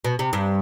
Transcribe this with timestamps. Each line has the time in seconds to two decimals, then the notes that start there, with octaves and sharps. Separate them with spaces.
0.05 B2
0.19 C3
0.33 G2